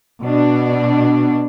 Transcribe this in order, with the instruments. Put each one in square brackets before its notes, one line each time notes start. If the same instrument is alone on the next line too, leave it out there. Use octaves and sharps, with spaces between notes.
[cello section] B2 D4